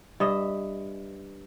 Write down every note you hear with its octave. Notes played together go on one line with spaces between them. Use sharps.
G2 D#5 E5